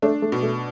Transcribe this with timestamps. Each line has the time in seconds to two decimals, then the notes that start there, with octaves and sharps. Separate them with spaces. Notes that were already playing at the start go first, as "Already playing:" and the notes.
0.02 A3 D4
0.22 A3
0.32 B2
0.43 A3